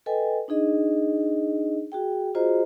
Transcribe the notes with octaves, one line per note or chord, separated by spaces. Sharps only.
A4 B4 D#5 G5 G#5
D4 D#4 G#4 D#5
F#4 G#4 G5
F4 F#4 G#4 C5 D#5 A#5